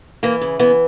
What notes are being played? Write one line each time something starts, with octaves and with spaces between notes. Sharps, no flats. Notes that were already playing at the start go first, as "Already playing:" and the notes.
E3 A#3
C#3
E3 B3